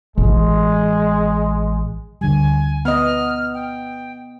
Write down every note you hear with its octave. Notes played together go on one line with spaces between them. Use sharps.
A1 G#3
D2 D3 G3 G#5
B3 D#5 F6
G5